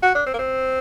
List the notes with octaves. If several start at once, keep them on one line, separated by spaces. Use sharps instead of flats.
F#4
D4
C4
A#3
C4